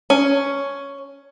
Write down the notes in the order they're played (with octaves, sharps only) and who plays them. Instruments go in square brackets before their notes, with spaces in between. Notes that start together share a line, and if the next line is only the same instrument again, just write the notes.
[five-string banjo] C#4